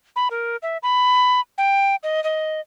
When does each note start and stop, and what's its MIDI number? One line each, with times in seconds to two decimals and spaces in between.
0.16 0.28 83
0.31 0.56 70
0.62 0.77 76
0.83 1.40 83
1.58 1.96 79
2.03 2.22 75
2.24 2.60 75